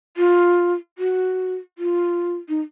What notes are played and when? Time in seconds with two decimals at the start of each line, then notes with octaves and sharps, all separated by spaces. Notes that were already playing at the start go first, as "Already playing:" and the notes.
0.17 F4
0.98 F#4
1.78 F4
2.49 D#4